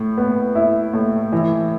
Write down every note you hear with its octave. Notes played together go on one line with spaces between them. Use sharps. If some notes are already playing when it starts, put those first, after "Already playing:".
Already playing: A2
B3
E4
A2
E3